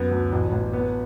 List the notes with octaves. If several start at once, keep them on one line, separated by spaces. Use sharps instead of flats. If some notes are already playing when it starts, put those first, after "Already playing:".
Already playing: F#2 B3
D2
A1
A1
B3